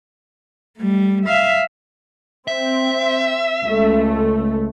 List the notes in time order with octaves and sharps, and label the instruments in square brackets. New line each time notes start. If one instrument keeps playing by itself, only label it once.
[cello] G3 A3
E5 F5
[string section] C4 [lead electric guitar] E5
[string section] C#2 A3